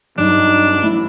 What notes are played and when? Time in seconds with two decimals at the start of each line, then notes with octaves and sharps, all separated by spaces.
0.18 G2 F#3 G3 D4 D#4
0.83 A1 A3 E4